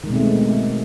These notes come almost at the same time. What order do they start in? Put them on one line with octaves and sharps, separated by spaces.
D#3 G#3 B2 C4 A3